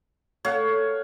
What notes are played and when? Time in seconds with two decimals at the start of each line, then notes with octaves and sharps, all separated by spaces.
0.45 A3 C#5 F5 F#5